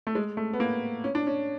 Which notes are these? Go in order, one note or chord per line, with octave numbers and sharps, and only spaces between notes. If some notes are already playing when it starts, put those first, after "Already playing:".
A3
G#3
A3
B3
A#3
C#4
D4
C#4